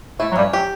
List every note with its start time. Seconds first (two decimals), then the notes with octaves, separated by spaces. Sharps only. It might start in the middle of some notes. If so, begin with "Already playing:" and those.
0.19 A2 A3 E4
0.32 F#3
0.36 G2 G3 C#4
0.53 F#3 G4